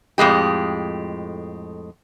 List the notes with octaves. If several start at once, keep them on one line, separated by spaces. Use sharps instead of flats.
F2 A2 G#3 G4